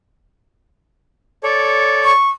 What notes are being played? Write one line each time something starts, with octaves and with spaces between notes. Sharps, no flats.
A4 C#5 D5
C#6